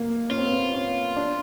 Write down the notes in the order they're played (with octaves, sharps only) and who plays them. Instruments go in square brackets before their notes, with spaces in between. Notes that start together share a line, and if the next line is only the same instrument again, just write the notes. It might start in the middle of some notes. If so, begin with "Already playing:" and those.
Already playing: [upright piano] A#3
[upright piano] C#4 [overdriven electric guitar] F4
[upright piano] C4
B3
C4
C#4
D4